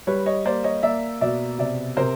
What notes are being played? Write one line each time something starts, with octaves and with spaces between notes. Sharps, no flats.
G3 B4 C#5
C#5 D#5
A#3 C5 D5
C#5 D#5
A#3 D5 E5
B2 D5 E5
C3 D5 E5
C3 A#4 C5